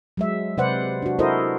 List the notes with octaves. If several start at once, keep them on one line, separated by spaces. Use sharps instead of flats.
F#3 G#3 E5
C3 B4 C5 D5 F#5
D4 F#4
E4 F#4 A4 A#4 C5 D#5